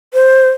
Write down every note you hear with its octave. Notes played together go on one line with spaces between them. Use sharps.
C5